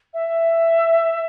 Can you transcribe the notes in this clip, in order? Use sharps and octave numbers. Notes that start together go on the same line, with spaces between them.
E5